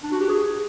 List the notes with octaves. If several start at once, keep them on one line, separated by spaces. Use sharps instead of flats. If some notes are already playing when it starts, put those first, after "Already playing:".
D4
F#4
G4
G#4